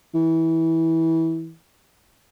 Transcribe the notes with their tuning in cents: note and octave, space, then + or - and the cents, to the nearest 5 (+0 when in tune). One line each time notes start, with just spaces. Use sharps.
E3 -20